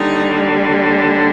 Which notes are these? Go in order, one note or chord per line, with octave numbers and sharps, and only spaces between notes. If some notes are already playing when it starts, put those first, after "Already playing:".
Already playing: D#2 D3 G3 D#4